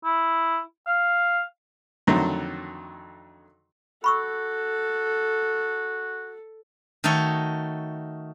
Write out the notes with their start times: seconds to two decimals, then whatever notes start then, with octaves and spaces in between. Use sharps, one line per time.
0.04 E4
0.87 F5
2.07 F2 D3 D#3 F#3 A3
4.04 F#4 A4 B5 C#6 E6
7.04 D#3 A3 D#4 F#4 A4 C#5